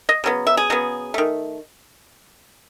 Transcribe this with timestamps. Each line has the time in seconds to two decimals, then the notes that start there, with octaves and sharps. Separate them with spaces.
0.09 D#5
0.24 C#3 F#3 B3
0.47 E5
0.57 G#4
0.70 C#3 F#3 B3
1.14 D#3 A3